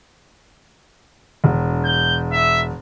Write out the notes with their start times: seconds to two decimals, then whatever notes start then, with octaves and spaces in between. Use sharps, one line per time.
1.44 E1
1.85 G6
2.32 E5